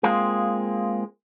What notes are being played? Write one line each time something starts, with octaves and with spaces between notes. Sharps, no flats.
G#3 A#3 C4 F4 G#4